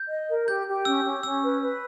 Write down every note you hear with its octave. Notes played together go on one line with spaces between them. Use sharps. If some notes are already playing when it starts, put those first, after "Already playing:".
Already playing: G6
D#5
A#4
G4 G6
G4
C#4 E6
C#4
C#4 E6
B4
B4